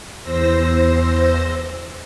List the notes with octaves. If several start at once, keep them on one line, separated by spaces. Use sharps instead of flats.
E2 C5 E6 A#6